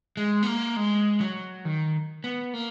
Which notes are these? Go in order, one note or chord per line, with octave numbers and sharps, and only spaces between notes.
G#3
B3
A#3
G#3
F#3
D#3
B3
A#3